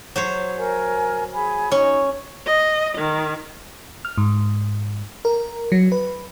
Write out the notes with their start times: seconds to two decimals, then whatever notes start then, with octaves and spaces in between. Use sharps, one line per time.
0.16 F#3 C5 C#5
0.58 A#4 G#5
1.33 G#4 G#5 B5
1.71 C#4 D#4 C#5
2.46 D#5
2.98 D#3
4.05 F6
4.18 G#2
5.25 A#4
5.72 F#3
5.92 B4